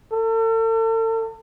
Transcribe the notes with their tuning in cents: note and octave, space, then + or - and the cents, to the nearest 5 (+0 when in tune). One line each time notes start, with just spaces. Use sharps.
A4 +40